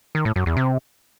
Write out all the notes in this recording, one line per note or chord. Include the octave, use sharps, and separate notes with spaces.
D#3
A2
F#2
E2
C3